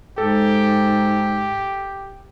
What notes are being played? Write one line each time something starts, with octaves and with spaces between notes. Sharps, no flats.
G#2 G4 A4